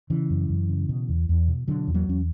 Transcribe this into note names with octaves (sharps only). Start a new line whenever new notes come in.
C#3 E3
F#2
F#2
C#3
B2
E2
E2
B2
B2 D3 F#3
E2
F#3 A#3
E2 C#4